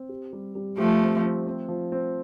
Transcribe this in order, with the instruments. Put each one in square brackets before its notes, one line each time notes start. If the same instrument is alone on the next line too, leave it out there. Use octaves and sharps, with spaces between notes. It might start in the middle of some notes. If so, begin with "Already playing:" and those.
Already playing: [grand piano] C4
G4
G3
G3
[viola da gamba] F3 A3 [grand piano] G4
[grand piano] C4
C4
C4
F3
C4